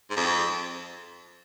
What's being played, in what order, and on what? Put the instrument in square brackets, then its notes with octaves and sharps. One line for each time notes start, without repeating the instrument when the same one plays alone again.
[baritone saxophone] G#2
F2